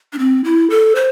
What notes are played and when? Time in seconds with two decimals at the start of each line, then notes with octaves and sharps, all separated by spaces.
0.13 D4
0.19 C4
0.44 E4
0.70 A4
0.96 C5